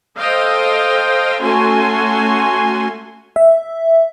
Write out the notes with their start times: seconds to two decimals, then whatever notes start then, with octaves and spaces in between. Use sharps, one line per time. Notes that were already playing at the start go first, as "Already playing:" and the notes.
0.17 A4 C5 D#5 F5 G5
1.42 A3 C#4 F#4 G#5 C6
3.36 E5